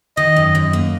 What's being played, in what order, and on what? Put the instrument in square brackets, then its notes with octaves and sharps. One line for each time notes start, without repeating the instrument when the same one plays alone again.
[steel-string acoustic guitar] D#3 [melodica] D#5
[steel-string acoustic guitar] F#2
F#2
A#3